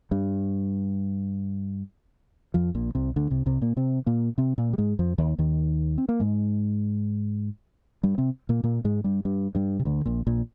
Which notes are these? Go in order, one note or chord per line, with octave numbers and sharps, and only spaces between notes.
G2 G3
F2 F3
A#1 A#2
C2 C3
D2 D3
C2 C3
C2 C3
A#2 A#3
C3 C4
A#2 A#3
C3 C4
A#2 A#3
G3
G#2 G#3
F2 F3
D#2 D#3
D#2 D#3
C4
A#3
G#2 G#3
G2 G3
C3 C4
A#2 A#3
A#2 A#3
G#2 G#3
G2 G3
G2 G3
G2 G3
C3
D2 D3
A#1 A#2
A#1 A#2